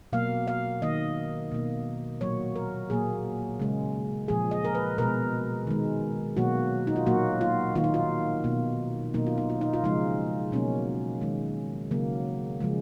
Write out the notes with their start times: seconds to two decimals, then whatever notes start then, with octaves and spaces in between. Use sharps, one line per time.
0.13 B2 F#3 A#3 F5
0.47 F5
0.82 D#3 A#3 D#5
1.52 B2 A#3
2.21 A#2 F#3 A#3 C#5
2.55 A#4
2.90 A#2 F#3 A#3 G#4
3.60 C#3 G#3
4.28 A#2 F3 G#3 G#4
4.51 D#5
4.65 A#4
4.75 B4
4.98 B2 G#3 A#4
5.67 D#3 G#3
6.37 B2 F#3 A#3 F#4
6.87 D#4
6.96 F4
7.06 A#2 F#3 A#3 F#4
7.41 F4
7.75 D#3 A#3 F4
7.84 D#4
7.94 F4
8.44 B2 A#3
9.14 B2 F#3 A#3 D#4
9.26 F4
9.38 D#4
9.50 F4
9.61 D#4
9.73 F4
9.84 C#3 F3 G#3 D#4
10.52 B2 F#3 A#3 C#4
11.21 D#3 G#3
11.91 C#3 F#3 A#3
12.60 C#3 F3 G#3